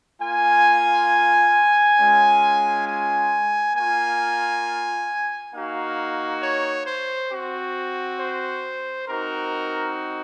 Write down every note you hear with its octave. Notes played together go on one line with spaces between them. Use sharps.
A#3 F4 G#5
G#3 C#4 F4
G#5
A#3 F4 G#5
A#3 D#4 F#4 F5
C#5
C5
C4 F#4
C5
C4 D#4 F#4 A#4